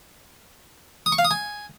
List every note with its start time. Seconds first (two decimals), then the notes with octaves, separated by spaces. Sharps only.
1.06 D#6
1.12 C#6
1.18 F5
1.25 D#6
1.31 G#5